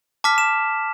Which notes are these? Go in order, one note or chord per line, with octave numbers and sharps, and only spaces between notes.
A5 D6 F6 B6
E7